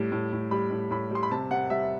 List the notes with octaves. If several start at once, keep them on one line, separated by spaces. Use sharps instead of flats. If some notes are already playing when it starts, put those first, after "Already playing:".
Already playing: A2 G3
A2
A2
G3 B5
A2
A2 B5
G3 C6
B5
C3 A5
C3 F#5
G3 E5